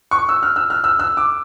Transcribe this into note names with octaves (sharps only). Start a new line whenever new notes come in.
C#6
E6
F6
E6
F6
E6
E6
D6